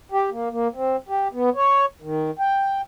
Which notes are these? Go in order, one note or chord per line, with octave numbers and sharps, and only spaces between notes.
G4
A#3
A#3
C4
G4
B3
C#5
D#3
G5